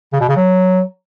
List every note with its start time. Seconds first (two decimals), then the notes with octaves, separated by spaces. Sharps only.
0.13 C#3
0.21 B2
0.29 C#3
0.36 F#3